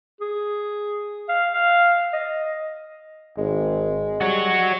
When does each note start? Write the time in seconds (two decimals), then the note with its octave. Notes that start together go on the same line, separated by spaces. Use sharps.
0.21 G#4
1.29 F5
1.53 F5
2.13 D#5
3.38 G#1 G#3
4.21 G3 F#4 C#5